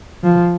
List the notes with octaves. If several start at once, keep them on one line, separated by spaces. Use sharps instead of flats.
F3